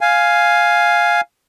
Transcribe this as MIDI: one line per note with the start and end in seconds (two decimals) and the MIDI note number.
0.01 1.21 77
0.01 1.21 80